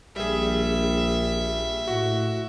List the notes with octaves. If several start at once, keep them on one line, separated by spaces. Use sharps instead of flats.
A#1 G3 G#4 E5
A2 F#4